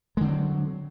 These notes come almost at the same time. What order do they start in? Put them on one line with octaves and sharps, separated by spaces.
G#3 D3 C4 F#3